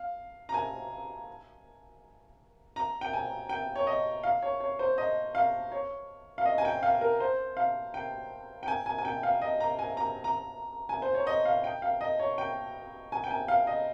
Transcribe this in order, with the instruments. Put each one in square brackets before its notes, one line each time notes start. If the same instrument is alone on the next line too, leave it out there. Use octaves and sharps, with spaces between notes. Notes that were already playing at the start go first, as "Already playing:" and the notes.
Already playing: [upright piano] F5
A#5
G#5
A#5
G5
G#5
G5
C#5
D#5
F5
C#5
C#5
C5
D#5
F5
C#5
F5
D#5
G#5
G5
F5
A#4
C5
F5
G5
G5
G#5
G#5
G#5
G5
F5
D#5
A#5
G#5
A#5
A#5
G#5
C5
C#5
D#5
F5
G5
F5
D#5
C#5
G5
G#5
G5
G#5
F5
D#5